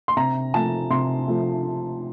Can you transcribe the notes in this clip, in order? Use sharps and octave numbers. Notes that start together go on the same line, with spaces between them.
C6
C3 A#5
F3 A3 A5
C3 C6
F3 A3